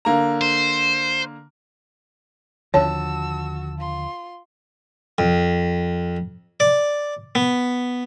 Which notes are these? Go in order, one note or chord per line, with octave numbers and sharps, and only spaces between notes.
D3 A#3 A#5
C5
D#2 D3 F3 F#4 C#5 A5 E6
F4 C6
F2
D5
B3